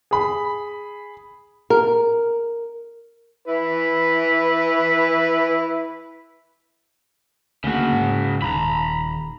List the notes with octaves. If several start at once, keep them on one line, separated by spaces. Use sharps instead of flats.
G#4 B5
A#4
E4 B4
D2 C#3 A#3 F#4
G#2
D#1 D#3 A#5 B5